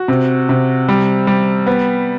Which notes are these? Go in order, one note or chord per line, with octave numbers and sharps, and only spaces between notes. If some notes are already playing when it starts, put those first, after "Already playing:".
Already playing: F#4
C3
C3
G3
G3
B3